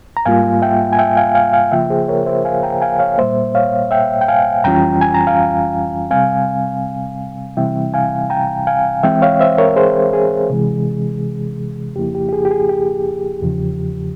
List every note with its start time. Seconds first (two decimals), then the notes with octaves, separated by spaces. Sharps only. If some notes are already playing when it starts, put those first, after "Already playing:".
0.17 A#5
0.25 G#2 G3 A#3 F4 F5 G#5
0.62 E5 G5
0.93 G#5
0.99 E5 G5
1.17 F5 G#5
1.35 F5 G#5
1.53 F5 G#5
1.72 C#3 F3 A#3 F4 E5 G5
1.90 G#4 C5
2.08 A#4 C#5
2.26 C5 E5
2.45 F5 G#5
2.63 G5 A#5
2.82 F5 G#5
2.99 C#5 F5
3.18 A#2 G3 A#3 C5 E5
3.55 C#5 F5
3.91 E5 G5
4.21 G5
4.28 F5 G#5
4.64 F2 E3 G3 C#4 F4 G5 A#5
5.01 G#5
5.14 A#5
5.27 F5 G#5
6.10 C3 G3 C4 F5 G#5
7.57 C3 E3 G3 C4 E4 E5 G5
7.94 F5 G#5
8.30 G5 A#5
8.67 F5 G#5
9.03 E3 G#3 C4 E5 G5
9.22 C#5 F5
9.40 C5 E5
9.58 A#4 C#5
9.76 G#4 C5
10.13 G#4
10.50 C3 E3 G#3
11.96 F2 C#3 F3 A#3 E4 G4
12.15 G4
12.29 G4
12.33 G#4
12.45 G4
12.51 G#4
12.69 G4
13.42 E2 C#3 F3